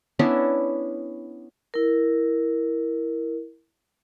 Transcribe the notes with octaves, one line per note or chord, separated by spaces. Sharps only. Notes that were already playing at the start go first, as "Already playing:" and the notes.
B3 C#4 D4 E4
E4 A#4